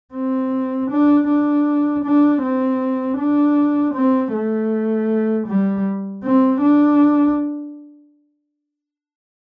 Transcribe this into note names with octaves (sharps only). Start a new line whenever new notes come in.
C4
D4
D4
D4
C4
D4
C4
A3
G3
C4
D4